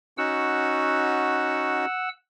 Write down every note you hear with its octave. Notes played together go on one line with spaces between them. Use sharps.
C#4 D#4 F#4 F#5 E6